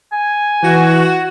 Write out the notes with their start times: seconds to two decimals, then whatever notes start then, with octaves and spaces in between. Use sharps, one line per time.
0.12 G#5
0.63 E3 F#4